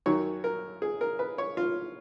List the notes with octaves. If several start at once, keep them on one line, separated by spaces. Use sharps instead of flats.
F#2 D#3 F#3 C#5
A#4
G#4
A#4
B4
C#5
F4